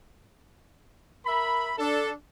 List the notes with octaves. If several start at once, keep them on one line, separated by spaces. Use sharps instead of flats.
A#4 E5 B5
D4 A4